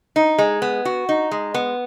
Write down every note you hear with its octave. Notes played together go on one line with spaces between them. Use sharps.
D#4
G#3
B3
F#4
D#4
G#3
B3